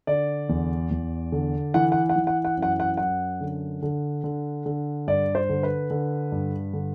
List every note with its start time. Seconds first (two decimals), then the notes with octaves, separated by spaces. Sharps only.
0.07 D3 D5
0.49 E2
0.91 E2
1.32 D3
1.74 E3 F#5
1.92 F#5
2.09 F#5
2.16 E3
2.27 F#5
2.45 F#5
2.57 F#2
2.62 F#5
2.80 F#5
2.97 F#2 F#5
3.41 D3
3.82 D3
4.24 D3
4.66 D3
5.07 G2 D5
5.35 C5
5.49 D3
5.63 B4
5.91 D3
6.32 G2
6.73 D3